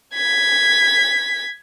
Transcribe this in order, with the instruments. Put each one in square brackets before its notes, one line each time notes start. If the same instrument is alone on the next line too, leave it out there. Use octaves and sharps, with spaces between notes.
[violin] G#6 B6